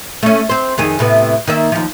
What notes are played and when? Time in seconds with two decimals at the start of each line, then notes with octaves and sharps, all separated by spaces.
0.23 A3 C#4
0.49 C4 C5
0.78 F2 D#3 G#4
0.99 A2 C3 B3
1.47 D#3 A#3 E5
1.72 D#2 F3